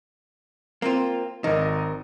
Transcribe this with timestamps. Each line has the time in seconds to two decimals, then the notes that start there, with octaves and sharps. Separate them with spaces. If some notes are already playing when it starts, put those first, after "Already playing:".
0.82 A#3 C4 F4
1.44 G#1 D#3 A#4 D#5